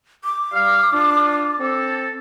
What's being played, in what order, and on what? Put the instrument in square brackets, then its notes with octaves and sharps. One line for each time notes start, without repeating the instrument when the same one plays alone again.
[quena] D6
[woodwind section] G3 F5
D4 F4
C4 A4